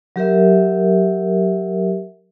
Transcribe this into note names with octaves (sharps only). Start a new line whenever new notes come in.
F#3 G4 A#4 E5